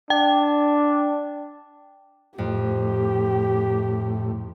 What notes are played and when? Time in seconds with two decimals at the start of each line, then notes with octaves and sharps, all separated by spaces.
0.10 D4 G5
2.38 F2 A2 G4